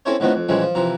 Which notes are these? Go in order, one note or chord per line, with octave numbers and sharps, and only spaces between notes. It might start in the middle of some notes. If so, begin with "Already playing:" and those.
C4 C#4 E4 A4 C5 C#5
A2 D#3 F3 B3 C4 D4
F2
A#2 E3 F3 G3 G#3 C#4
F3
C3 E3 F3 A#5